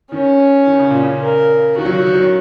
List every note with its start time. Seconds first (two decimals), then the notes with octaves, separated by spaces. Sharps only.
0.12 D#3 C#4
0.67 D#3
0.79 C#3
0.90 A#2
1.03 C#3
1.22 A#4
1.78 D#3 F#4
1.85 F#3
1.92 D#3
1.99 F#3
2.06 D#3
2.14 F#3
2.21 D#3